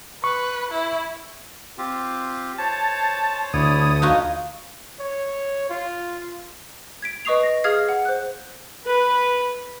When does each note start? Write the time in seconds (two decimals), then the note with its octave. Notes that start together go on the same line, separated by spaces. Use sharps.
0.24 B4 C#6
0.72 E4
1.78 C4 F4 G4
2.58 C5 C#5 A5
3.54 D2 E4 C#5 D5 D#6
4.02 D4 D#4 F4 F#4 B4 C#5
4.99 C#5
5.69 F4
7.02 G#6 B6 D7
7.25 B4 D#5 C#6 D#6 C7 F7
7.43 A#6
7.64 G#4 F5 D#6 F6 G#6 C7
7.89 F#5
8.05 C5 F#6
8.86 B4